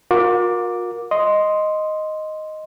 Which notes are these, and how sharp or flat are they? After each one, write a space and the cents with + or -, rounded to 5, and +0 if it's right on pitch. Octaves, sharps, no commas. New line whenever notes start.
F4 +45 A#4 +15 D6 +0
D#5 +0 C6 +0